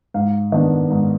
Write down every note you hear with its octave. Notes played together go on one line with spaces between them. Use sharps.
G#2 F5
D#3 B3 D4 D#5
G#2